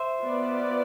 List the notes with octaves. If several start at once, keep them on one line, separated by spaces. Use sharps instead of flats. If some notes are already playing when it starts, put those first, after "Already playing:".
Already playing: C5 E5
B3 F4 B4 D5